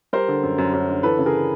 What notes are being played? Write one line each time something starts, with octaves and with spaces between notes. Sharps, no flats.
G3 A#4 C5
D3
F#2
F#2
F#2
D3
E3 A4 B4
C#3
G#4 A#4